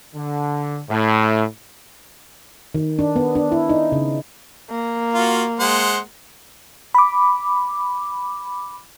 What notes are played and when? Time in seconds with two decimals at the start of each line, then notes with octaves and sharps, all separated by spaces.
0.15 D3
0.90 A2
2.75 D#3
2.99 D4
3.16 B3
3.35 D4
3.52 E4
3.69 D#4
3.92 C#3
4.70 A#3
5.13 F4 F#4
5.60 G#3 C5 F#5
6.95 B5 D6